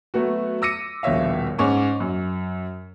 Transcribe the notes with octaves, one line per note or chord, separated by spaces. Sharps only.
F#3 A3 B3 F#4
D6 E6 A#6 C#7 D#7
D#1 A#1 B2 C#5 E5 F5
G#2 C#4 C#6 D6
F#2